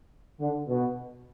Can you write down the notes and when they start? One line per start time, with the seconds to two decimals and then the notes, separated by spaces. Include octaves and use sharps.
0.40 D3
0.68 B2